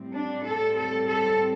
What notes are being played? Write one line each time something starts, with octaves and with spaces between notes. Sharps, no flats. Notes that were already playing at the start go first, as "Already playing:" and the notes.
Already playing: A2 G3 C4
D4
A4
A4
A4